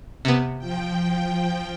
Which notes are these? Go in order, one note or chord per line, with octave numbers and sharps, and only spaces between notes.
C3 B3
F3 G5